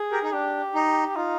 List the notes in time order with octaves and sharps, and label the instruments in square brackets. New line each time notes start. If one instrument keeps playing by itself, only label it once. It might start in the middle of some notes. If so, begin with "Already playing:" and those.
Already playing: [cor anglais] G#4
[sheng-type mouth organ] G4 A#4
D#4
[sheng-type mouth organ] D4 [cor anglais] G4
[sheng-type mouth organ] D#4
[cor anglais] D#4 [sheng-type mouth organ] F4